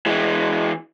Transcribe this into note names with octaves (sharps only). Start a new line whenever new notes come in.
E3 G#3